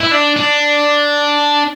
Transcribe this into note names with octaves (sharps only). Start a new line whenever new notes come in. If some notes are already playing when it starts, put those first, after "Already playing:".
E4
D4
D4